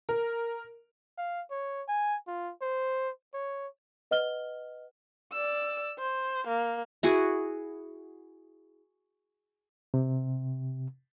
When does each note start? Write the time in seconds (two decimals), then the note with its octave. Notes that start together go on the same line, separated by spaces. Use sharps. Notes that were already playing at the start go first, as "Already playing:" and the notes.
0.09 A#4
1.18 F5
1.51 C#5
1.88 G#5
2.27 F4
2.62 C5
3.34 C#5
4.11 B4 D#5 F#5 F6 G7
5.32 D5 E6
5.98 C5
6.47 A#3
7.03 E4 F#4 G#4
9.94 C3